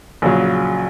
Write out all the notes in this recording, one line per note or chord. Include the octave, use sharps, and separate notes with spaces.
A#1 C#3 F#3